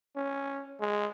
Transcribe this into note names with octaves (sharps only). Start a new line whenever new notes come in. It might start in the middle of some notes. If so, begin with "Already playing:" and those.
C#4
G#3